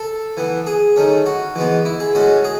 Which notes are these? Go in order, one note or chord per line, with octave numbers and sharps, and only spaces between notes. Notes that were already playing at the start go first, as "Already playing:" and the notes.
Already playing: A4
E3 B3
G#4
D#3 A3 C#4
F#4
E3 G#3 B3
E4
G#4
A2 G#3 C#4 F#4
G#4